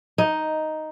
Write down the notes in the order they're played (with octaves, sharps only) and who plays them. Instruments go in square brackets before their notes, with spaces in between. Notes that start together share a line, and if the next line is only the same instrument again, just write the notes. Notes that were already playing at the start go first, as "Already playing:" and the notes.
[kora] D#4